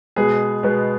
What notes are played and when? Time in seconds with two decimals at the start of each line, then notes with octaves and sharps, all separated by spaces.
0.16 B2 G#3 B3 G#4
0.63 B2 G#3 B3